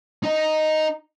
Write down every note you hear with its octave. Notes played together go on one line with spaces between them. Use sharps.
D#4 D#5